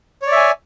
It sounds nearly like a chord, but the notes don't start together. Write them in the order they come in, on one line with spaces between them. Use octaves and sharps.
C#5 D5 E5 G#5